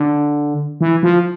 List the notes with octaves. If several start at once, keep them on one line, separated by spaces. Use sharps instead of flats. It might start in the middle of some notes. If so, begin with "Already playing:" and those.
Already playing: D3
E3
F3